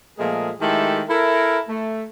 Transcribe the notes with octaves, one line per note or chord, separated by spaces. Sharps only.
A#2 F3 G#3 A3 G#4 A#4
D#3 G#3 A3 E4 G4 A4
E4 A4 A#4
A3